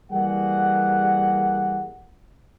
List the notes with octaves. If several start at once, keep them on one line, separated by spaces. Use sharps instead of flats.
E3 G3 A#3 G#4 F#5